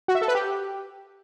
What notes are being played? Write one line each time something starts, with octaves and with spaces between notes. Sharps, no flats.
F#4
E5
A4
B4
G4